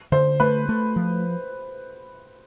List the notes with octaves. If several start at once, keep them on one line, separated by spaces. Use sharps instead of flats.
D3 C5
A3 B4
A3
F3